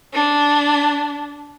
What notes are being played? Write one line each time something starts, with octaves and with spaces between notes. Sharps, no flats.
D4